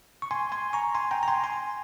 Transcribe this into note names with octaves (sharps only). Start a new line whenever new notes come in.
C#6
G#5 C6
G#5 C6
A#5 C#6
G#5 C6
G5 A#5
A#5
G#5 C6
G#5 C6